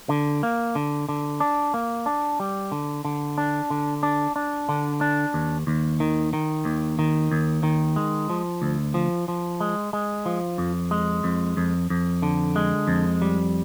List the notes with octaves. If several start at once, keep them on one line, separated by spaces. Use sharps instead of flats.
D3
A#3
D3
D3
D4
A#3
D4
G3
D3
D3
D4
D3
D4
D4
D3
D4
D#2
D#2
D#3
D#3
D#2
D#3
D#2
D#3
G#3
F3
D2
F3
F3
G#3
G#3
F3
F2
G#3
F2
F2
F2
D3
G#3
F2
G3